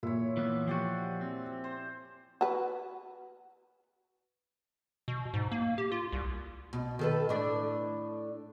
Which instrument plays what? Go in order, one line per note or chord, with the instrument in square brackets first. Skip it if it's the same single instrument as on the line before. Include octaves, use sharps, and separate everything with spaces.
[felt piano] A#2 [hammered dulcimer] E4 C#5
[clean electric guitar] E3 A#3 B3
[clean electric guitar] F3 F#4 [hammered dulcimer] G4 D5 G#5
[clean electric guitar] C4
[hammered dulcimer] C5
[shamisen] F#4 B4
[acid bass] B2
G#2
A#3
G4
F4
C2
[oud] B2
D#3 A4 B4
A2 D4